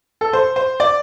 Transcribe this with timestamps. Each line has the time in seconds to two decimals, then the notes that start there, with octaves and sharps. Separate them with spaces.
0.21 A4
0.33 C5
0.56 C5
0.80 D5